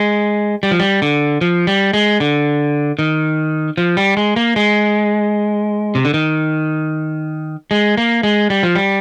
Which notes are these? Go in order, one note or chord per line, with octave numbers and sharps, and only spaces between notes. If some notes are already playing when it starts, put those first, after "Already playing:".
Already playing: G#3
G3
F3
G3
D3
F3
G3
G#3
D3
D#3
F3
G3
G#3
A#3
G#3
C3
D3
D#3
G#3
A#3
G#3
G3
F3
G3